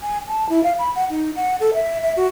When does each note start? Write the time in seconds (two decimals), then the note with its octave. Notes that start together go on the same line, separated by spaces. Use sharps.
0.02 G#5
0.28 A5
0.49 E4
0.63 F5
0.79 B5
0.95 F#5
1.10 D#4
1.36 F#5
1.60 A4
1.74 E5
2.02 E5
2.16 F#4